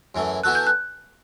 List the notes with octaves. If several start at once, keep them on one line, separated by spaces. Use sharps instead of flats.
F#2 E3 A3
E3 B3 F#4 A4 F#6
G6
F#6